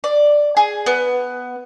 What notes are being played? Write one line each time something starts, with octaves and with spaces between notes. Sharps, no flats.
D5
G#4
B3